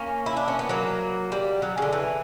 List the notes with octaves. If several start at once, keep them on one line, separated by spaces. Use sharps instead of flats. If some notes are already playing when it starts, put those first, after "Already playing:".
Already playing: A#3 C#4
E4
D4
C#4
B3
F#3 A#3
G3
F#3
C#3
D3
E3